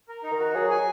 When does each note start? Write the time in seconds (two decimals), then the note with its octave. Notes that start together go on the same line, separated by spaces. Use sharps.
0.08 A#4
0.23 D#4
0.31 D#3
0.39 F#4
0.54 F#3 G#4
0.70 F#3 G#5